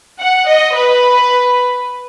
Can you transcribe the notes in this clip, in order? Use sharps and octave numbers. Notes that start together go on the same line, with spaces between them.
F#5
D#5
B4